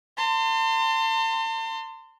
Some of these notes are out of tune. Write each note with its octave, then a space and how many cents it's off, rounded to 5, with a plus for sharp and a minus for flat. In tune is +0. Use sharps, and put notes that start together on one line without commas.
A5 +40 C6 -10